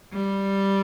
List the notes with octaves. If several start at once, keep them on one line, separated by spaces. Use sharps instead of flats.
G3